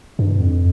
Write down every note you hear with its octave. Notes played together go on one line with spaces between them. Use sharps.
G2
F2